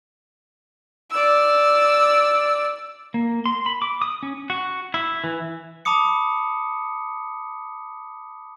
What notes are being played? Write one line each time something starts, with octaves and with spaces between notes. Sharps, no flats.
D5 E6
A#3
C6
B5
D6
D#6
C#4
F#4
E4
E3
A5 B5 D6 D#6 C#7